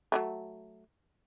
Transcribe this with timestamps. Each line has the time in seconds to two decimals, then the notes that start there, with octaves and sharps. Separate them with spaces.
0.12 F#3 G#3 A3